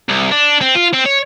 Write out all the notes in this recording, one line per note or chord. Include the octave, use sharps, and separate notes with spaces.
C2
D4
C4
F4
C4
C#5